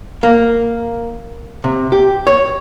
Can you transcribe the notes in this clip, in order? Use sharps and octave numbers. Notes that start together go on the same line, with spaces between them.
A#3
C3
G4
C#5